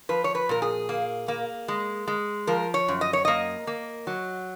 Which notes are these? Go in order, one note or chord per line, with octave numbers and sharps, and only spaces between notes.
F3 B4
C#5
B4
A#2 A#4
G#4
A#3
A#3
G#3
G#3
F3 A#4
C#5
F#2
D#5
C#5
A#3 D#5
A#3
F#3